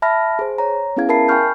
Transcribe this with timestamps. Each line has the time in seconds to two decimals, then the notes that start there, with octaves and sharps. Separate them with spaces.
0.02 E5 A5 B5 F6 A#6
0.39 G#4 C5
0.58 C#5 A#5
0.97 B3 C#4 E4 G#4 F5 G#6
1.09 A#4 E5 A5 B5 C7
1.28 G5 G#5 B5 C#6 F6 G6